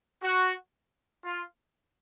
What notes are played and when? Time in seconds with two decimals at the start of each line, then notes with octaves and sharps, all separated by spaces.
0.21 F#4
1.25 F4